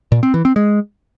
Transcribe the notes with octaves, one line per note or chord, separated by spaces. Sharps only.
A#2
C4
E3
C4
G#3